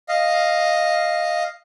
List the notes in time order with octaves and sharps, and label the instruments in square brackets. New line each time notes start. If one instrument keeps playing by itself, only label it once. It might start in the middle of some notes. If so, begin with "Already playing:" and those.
[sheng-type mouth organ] D#5 F5